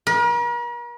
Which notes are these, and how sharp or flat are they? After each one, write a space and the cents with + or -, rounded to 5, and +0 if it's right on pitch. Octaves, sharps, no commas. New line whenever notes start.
A#4 +45